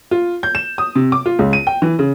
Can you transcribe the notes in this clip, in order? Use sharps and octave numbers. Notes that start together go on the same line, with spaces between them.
F4
G6
E7
D#6
C3
D6
F4
C#2
D#7
G5
E3
C#3